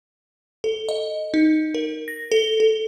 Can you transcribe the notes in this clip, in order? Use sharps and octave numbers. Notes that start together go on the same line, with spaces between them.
A4
D#5
D#4
A#4
A#6
A4
A4